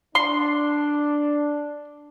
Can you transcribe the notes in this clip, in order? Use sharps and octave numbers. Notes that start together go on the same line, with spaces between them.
D4 C6